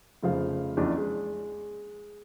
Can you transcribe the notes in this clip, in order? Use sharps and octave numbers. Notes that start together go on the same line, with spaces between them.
F1 C#3 F3 F5
A#1 E2 C#4 D4 D5 D#5
G#3